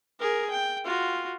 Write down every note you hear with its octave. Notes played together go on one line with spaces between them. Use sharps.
G#4 A#4
G5
F4 F#4